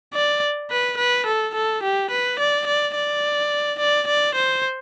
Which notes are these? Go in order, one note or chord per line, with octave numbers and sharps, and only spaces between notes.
D5
B4
B4
A4
A4
G4
B4
D5
D5
D5
D5
D5
C5